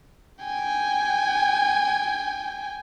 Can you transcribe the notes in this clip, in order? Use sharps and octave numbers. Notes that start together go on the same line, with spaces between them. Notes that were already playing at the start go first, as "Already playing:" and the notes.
G5 G#5